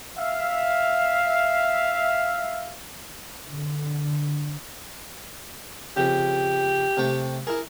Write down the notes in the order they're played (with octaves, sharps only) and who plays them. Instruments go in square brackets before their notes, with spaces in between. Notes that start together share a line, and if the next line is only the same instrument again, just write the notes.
[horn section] E5 F5
[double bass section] D3
[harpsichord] F2 C#3 [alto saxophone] G4
[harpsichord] C3 A3 G5
[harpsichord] E4 G#4 [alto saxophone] A#4